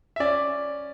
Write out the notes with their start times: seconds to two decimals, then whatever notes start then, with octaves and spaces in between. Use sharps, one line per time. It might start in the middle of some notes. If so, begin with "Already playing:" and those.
0.16 E5
0.20 C#4 D5